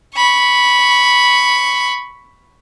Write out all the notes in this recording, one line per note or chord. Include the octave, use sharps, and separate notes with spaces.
B5 C#6